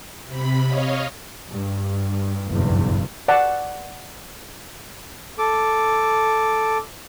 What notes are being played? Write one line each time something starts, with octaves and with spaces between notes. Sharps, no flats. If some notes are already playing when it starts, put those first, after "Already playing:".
C3 B5
C#5 D#5 F5
G2
F#1 B1 E2 G2
D5 F#5 A5
A4 D6